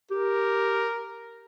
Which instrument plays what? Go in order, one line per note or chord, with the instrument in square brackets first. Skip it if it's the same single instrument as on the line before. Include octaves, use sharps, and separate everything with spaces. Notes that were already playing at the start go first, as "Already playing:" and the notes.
[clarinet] G4 [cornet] A#4